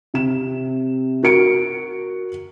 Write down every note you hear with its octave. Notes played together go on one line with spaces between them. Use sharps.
C3 E7
F#4 A#4 C#7 D7